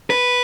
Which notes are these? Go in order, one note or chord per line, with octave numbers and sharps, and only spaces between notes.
B4